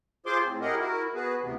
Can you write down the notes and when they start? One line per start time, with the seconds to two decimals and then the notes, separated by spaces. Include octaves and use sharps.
0.26 F4 G#4 C5 C6 D6
0.45 A2 C4
0.61 E4 G4 G#4 A#4 D#5 F#5
0.79 E4 F#4 A#4
1.14 B3 F#4 G#4 B4
1.43 D2 C3 E3 B3